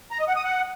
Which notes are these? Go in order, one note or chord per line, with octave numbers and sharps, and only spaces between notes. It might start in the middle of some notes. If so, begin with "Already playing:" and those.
A#5
D#5
F#5
D#6
F#5